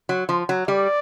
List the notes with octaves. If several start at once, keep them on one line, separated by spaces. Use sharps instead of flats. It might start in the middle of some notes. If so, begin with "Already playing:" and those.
F#3
F3
F#3
G3 D5